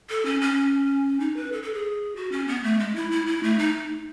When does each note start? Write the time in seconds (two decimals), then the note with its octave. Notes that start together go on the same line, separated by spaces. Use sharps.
0.10 A4
0.26 C#4
0.41 C#4
1.20 D#4
1.37 B4
1.52 A4
1.63 A4
1.74 G#4
2.16 F#4
2.32 C#4
2.48 B3
2.63 A3
2.80 G#3
2.96 E4
3.11 E4
3.27 E4
3.43 A3
3.59 D#4